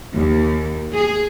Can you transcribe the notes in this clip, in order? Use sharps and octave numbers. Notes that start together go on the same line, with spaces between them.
D#2
G#4